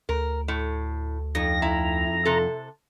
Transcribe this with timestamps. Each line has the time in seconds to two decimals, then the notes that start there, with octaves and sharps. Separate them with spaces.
0.09 D2 A#4
0.48 A2
1.35 F2 D#4 A#6
1.62 E4 A#5
2.25 C3 A4